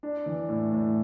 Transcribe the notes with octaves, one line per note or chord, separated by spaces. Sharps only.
D4
E3
A2
A2